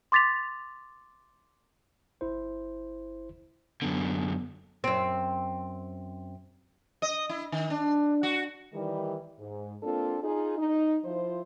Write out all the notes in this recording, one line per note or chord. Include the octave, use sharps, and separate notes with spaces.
C6 D6 A6 B6 F7
G1 E4 C5
F#2 D3 B3
F#2 C4
D#5
E4
D#3
D4
F#4
D#3 E3 G3
G#2
A#3 C4 D4 F4 A4
D#4 F4 G#4
D#4
F3 E4 F4 C5